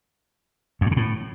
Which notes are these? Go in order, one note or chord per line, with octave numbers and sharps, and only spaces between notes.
F2
G2
C#3
A2